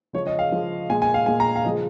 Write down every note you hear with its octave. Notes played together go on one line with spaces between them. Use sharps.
C#3 F3 G#3 C#5
D#5
F5
C#3 F3 G#3
A#2 G#3 G#5
G#5
F5
A#2 G#3 G#5
A#5
F5
C#3 F3 G#3 D#5